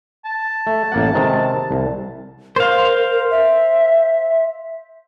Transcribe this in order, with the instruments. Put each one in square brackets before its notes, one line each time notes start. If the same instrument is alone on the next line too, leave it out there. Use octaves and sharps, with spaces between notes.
[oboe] A5
[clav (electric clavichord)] A3
A1 A#3 F#5
C3 D#3 G#3
C2
[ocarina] A#4 [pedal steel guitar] C5 F5
[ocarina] E5